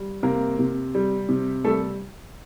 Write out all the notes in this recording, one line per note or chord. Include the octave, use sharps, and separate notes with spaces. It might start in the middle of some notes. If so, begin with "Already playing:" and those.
Already playing: G3
C3 A#3 A#4
C3
G3
C3
G3 A3 A4